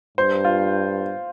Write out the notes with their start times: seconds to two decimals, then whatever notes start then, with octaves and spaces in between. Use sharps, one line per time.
0.18 G2 C5
0.45 F4